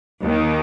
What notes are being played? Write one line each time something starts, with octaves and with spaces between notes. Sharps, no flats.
D#2 D#3